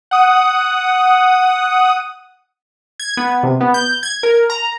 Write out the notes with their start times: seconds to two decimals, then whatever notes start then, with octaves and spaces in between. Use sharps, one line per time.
0.11 F#5 D#6
3.00 G#6
3.17 B3
3.43 C3
3.61 B3
3.74 G6
4.03 G#6
4.23 A#4
4.50 A#5